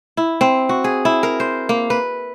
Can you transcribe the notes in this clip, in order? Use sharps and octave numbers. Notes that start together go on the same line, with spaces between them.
E4
C4
F#4
G#4
E4
A#4
C5
A#3
B4